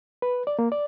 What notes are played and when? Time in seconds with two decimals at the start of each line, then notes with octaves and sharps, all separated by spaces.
0.22 B4
0.47 D5
0.59 A#3
0.72 D5